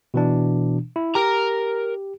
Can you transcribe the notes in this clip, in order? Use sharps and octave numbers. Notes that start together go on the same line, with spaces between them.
B2 E3 D4
E4
G4 A#4 A#5